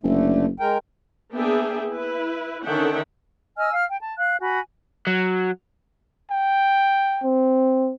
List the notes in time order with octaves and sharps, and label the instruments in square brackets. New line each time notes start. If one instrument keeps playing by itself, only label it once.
[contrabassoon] F#1 [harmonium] D3 A3
[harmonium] G#3 A#4 G5
[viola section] A#3 B3 D4 G#4 E5 G5
E4 B4
D3 D#3 C#4 E5 F#5 G5
[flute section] D#5 G#5 E6 F6
F5 F6
G5
A5
F5 F#6
F#4 G#5 B5
[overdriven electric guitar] F#3
[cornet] G5
[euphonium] C4